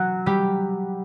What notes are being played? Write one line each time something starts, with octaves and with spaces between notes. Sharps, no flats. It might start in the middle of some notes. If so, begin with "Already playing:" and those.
Already playing: F#3 F#4
G3 G4